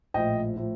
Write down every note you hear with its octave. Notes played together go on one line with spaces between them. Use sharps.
A#1 A2 F3 D#5 G5
A2 F3